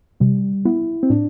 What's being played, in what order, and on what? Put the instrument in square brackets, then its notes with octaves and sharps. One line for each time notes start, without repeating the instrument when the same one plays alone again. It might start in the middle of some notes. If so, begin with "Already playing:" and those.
[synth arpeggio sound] C3 [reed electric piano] G3
[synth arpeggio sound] B3 [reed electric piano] E4
[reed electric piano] C4
[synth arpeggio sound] A2 [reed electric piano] D4